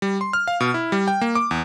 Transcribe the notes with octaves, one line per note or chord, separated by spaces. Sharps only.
G3
C6
F6
F5
B2
E4
G3
G5
A#3
D6
E2